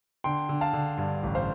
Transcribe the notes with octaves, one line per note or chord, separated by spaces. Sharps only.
D3 G5 C6
D3
F5 A5
D3
G2
A1
C5 F5